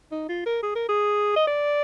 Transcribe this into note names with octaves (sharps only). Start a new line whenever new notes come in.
D#4
F4
A#4
G#4
A#4
G#4
D#5
D5